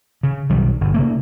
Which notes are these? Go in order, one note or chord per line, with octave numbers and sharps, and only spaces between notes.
C#3
B1 D#3 F#3 G3
G1
C#3 A3 A#3